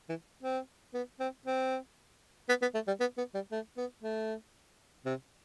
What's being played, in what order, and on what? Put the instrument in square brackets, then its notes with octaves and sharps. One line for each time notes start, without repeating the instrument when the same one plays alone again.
[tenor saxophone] E3
C4
B3
C4
C4
B3
B3
A3
G3
B3
B3
G3
A3
B3
A3
C3